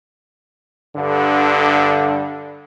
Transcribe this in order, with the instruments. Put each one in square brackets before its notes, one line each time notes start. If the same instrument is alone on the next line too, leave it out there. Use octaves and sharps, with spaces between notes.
[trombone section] G2 D3